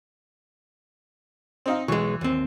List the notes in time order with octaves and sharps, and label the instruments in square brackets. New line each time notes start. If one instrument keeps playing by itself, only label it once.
[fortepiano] C4 D#4 F5
[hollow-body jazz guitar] B1 G#3 [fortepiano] E3 C#6
[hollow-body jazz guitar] D#2 C4